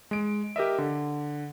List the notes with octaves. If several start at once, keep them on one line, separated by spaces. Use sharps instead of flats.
G#3 D7
G4 A#4 D#5 E5
D3